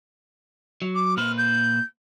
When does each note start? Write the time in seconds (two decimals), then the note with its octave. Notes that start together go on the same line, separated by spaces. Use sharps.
0.82 F#3
0.95 D6
1.17 A#2 B4 C5 F6
1.38 G6